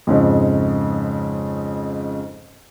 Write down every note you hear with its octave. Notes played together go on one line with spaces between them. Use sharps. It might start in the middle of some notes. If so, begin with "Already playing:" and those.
F2 G#2 C#3